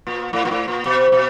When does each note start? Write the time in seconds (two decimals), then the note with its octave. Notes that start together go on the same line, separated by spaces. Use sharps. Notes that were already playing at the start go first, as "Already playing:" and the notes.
0.07 A#2
0.33 A2
0.45 A#2
0.51 A2
0.68 A#2
0.86 B2
1.12 B2